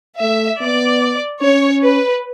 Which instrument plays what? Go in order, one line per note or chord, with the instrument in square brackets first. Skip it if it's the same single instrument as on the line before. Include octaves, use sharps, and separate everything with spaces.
[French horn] A3 [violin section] E5
[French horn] B3 [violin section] D5
[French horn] C#4 [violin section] C#5
[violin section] B4